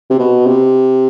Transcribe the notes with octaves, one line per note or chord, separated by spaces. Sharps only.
C3
B2
C3